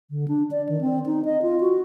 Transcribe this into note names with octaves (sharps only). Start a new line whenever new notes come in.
D3
D4
D5
D#3
C4
D#4
D#5
F4
F#4